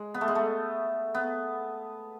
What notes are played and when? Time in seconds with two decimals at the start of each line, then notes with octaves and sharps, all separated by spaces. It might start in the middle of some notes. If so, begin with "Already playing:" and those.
Already playing: G#3
0.14 B3
0.21 A3
0.28 G#3
0.35 A3
1.14 B3